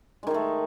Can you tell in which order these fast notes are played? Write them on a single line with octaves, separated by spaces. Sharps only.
G#3 D#3 G#4 A3